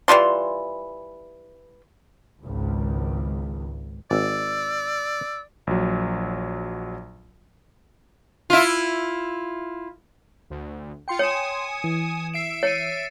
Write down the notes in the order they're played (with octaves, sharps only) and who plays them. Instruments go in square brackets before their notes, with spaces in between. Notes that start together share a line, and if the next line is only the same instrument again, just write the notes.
[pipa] E3 G3 F4 C6
[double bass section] G#1 C#2
[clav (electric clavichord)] G#1 [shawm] D5 [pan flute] E6
[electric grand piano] A#1 F#3
[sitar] E4 F4
[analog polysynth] D2
[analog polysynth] F4 C#7 [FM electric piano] G5 C6
[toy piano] C#5 [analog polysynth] G#5 D#6 [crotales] C#7 E7
[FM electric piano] E3
[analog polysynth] E5 D7 [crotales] C7 E7
[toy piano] C#5 [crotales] A6 C#7 D#7